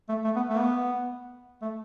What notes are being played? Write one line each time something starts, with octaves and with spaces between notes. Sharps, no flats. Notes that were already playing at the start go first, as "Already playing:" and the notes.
A3
A3
B3
A3
B3
A3